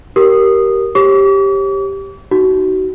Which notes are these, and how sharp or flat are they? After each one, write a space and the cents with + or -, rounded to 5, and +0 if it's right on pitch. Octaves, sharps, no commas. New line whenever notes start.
G4 -20 A#4 +0 D#6 -15
G4 +0 C#5 -35 D6 -45
D#4 +0 F#4 +25